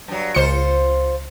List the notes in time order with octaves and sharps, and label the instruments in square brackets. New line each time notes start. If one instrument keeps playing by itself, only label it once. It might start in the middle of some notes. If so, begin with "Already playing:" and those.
[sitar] G2 F#3
[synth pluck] C#2 C#7 [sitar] F4 C5